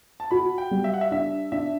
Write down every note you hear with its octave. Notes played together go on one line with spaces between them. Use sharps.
A5
F#4 B5
G5
G3
E5
F#5
E5
D4 E5
D4 E5